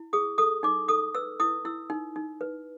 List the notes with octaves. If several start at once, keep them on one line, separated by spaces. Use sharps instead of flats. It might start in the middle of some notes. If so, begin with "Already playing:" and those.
Already playing: E4
G#4 D#6
A4 D#6
D#4 D6
A4 D#6
B4 E6
E4 D#6
E4 E6
D#4
D#4
B4